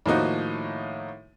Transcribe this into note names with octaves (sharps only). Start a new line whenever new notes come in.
A2 D#3 F3 A#3 D#4 F#4